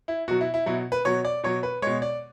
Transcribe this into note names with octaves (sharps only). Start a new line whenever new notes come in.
E4
B2 F#3 F#4
E4
E4
B2 F#3 E4
B4
B2 F#3 C#5
D5
B2 F#3 C#5
B4
B2 G#3 C#5
D5